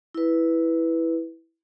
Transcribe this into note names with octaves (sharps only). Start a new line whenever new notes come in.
E4 B4